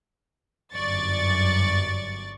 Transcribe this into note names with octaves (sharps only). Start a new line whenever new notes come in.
G1 F#2 D5 C#6 A6